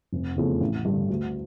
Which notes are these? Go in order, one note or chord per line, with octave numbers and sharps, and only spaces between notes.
F1
E2 C#3 F3 A3
A1
G2 D3
D2